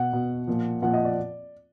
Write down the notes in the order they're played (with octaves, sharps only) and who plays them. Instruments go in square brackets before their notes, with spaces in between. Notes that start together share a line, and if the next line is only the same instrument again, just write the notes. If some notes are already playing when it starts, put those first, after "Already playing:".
Already playing: [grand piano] B2 F#5
B2
A#2 F3
A#2 F3 F#5
D#5
D5